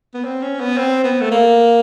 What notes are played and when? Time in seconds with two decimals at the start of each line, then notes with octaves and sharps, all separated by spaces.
0.14 B3
0.24 C4
0.42 C#4
0.60 B3
0.78 C4
1.04 B3
1.20 A3
1.31 A#3